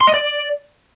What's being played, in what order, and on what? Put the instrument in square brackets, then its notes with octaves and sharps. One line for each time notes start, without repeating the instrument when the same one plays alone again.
[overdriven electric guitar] C6
D#5
D5